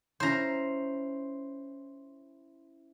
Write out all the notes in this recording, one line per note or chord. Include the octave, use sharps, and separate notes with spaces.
C#4 E4 C5 C#5 A#5